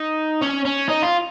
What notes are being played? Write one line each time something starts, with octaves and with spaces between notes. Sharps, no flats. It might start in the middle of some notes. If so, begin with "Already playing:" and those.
Already playing: D#4
C#4
C#4
D#4
F4